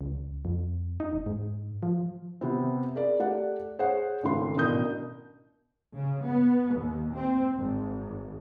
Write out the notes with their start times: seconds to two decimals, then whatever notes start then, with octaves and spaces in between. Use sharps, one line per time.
0.01 C#2
0.45 F2
1.00 D#4
1.13 E1
1.26 G#2
1.83 F3
2.41 C3 B3 C4
2.95 G#4 A#4 D5
3.20 A3 G4 D5 F#5
3.79 G#4 C5 C#5 F#5
4.23 G#1 C#2 A3 C6
4.56 A1 B2 D4 A#4 D#6 G6
5.95 C#3
6.25 B3
6.77 D#2
7.16 C4
7.56 G#1